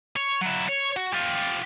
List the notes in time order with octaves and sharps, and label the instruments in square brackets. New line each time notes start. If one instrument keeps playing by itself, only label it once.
[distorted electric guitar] C#5
F#3 E4
C#5
F#4
F4 G4